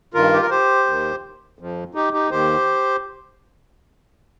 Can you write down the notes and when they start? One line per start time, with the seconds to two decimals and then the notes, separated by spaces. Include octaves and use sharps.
0.14 G2 D#3 F4 A#4
0.33 G4
0.42 A#4
0.50 G4 C5
0.87 D#2 D#3
1.59 F2 F3
1.94 D#4 G4
2.13 D#4 G4
2.31 D#2 D#3 G4 C5